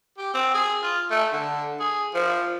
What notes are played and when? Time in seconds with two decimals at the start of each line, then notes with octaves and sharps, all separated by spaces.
0.18 G4
0.34 C4
0.54 G#4
0.83 F4
1.10 A3
1.33 D3
1.80 G#4
2.14 F3